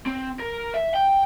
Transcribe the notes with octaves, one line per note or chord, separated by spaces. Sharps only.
C4
A#4
E5
G5